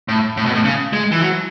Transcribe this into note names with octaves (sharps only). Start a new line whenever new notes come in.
A2
A2
B2
A2
C#3
G#3
E3
F#3